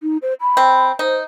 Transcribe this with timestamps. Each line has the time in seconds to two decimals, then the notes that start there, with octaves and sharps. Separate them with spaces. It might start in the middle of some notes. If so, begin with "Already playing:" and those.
0.03 D#4
0.22 C5
0.41 B5
0.57 C4
0.99 D#4 C5